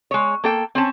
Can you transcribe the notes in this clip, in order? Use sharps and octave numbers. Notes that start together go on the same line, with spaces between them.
G#3 C#5
A#3 A4 G5
C4 C#4 A5